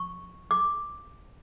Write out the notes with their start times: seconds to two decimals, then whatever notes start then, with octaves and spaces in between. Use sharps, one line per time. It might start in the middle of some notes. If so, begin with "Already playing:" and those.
Already playing: C#6
0.51 D6